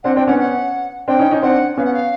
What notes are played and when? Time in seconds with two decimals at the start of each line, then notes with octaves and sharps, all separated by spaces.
0.04 C4 D4 F#5
0.15 C4 D4 G5
0.27 B3 C#4 F#5
0.39 F#5
1.08 C4 D4 G5
1.19 C#4 D#4
1.31 C#4 D#4
1.42 C4 D4 F#5
1.77 B3 C#4 F5
1.85 F#5
1.94 F5